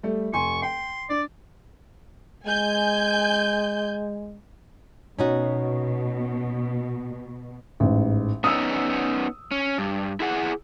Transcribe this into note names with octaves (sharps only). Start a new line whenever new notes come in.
G3 A3
F1 G#5 C6 C#6
G5 C6
D4 D5
G#3 G#5 G6
B2 C#4 D#4 F#4
A1 G#2
B3 C#4 D#4 D#6 E6
C#4
G2
E4 G#4 F#5